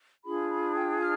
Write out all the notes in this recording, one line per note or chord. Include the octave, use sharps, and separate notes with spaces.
D4 F4 G#4 B5
B5
G5
F6